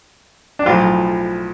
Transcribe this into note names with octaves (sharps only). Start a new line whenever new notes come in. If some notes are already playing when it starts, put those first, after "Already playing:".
D4
B1 A2 F3 F4